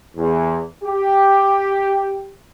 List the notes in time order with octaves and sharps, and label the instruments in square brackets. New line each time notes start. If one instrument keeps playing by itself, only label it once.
[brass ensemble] E2
G4